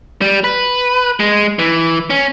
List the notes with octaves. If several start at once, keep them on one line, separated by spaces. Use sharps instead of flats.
G3
B4
G#3
E3
C#4